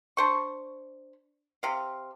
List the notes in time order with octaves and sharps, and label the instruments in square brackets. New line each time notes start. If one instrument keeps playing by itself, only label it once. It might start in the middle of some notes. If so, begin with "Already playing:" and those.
[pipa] D4 C5 C#6
C3 F5